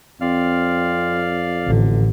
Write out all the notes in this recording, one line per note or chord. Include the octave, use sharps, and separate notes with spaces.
F2 C4 D5 F5 F6
A1 D3